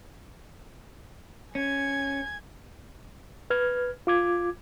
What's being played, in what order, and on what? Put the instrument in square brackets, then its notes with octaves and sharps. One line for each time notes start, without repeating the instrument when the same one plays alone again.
[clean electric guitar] C#4 [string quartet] G#5 G#6
[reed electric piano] B4 F6 G#6
F4 D6 G#6